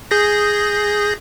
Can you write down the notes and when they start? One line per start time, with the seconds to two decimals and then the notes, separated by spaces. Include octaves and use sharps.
0.11 G#4 G6 A#6